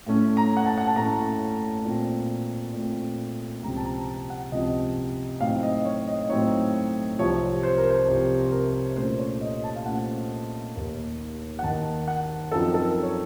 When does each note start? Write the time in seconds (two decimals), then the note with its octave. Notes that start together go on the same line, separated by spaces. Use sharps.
0.07 A2 A3 C#4
0.37 A#5
0.57 F#5
0.66 A5
0.78 F#5
0.87 A5
0.96 A2 A3 C#4 A#5
1.85 A#2 A3 C4
2.73 A#2 A3 C4
3.63 C#2 C3 F3 C4 A#5
3.76 A5
3.85 A#5
3.99 A#5
4.07 A5
4.30 F#5
4.52 C#2 C3 F3 C4 D#5
5.40 A2 F#3 C4 D#4 F5
5.63 D#5
5.85 C#5
6.07 D#5
6.29 A2 F#3 C4 D#4 C#5
7.19 C2 C3 F3 C#5
7.63 C5
7.77 A#4
7.90 C5
8.08 C2 C3 F3
8.52 A#4
8.96 A#2 A3 C#4 C5
9.19 C#5
9.41 D#5
9.64 A5
9.76 F5
9.85 A#2 A3 C#4 F#5
10.74 D#2 D#3 A#3 D#4
11.59 F#5
11.63 D#2 D#3 A#3 D#4 A5
12.08 F#5
12.52 F#2 F3 C4 D#4 A4
12.74 A4
12.82 A#4
13.03 C#5